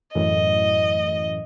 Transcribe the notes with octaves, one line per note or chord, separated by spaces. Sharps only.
F#2 A2 E3 D#5